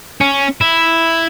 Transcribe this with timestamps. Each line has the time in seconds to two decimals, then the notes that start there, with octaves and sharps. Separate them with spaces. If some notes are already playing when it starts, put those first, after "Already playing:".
0.21 C#4
0.61 E4